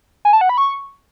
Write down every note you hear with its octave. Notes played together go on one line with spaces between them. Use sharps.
G#5
A5
F#5
B5
C#6